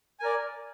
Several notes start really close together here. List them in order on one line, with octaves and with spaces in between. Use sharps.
G#5 A#4 D5